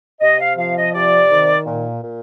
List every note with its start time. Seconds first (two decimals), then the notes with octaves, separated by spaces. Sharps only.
0.21 C3 D#5
0.40 F5
0.57 F3 F5
0.76 D#5
0.93 C3 D5
1.30 D#3
1.66 A#2
2.02 A#2